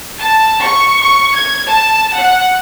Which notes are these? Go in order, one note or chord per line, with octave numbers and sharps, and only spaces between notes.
A5
C#6
C#6
G#6
A5
F#5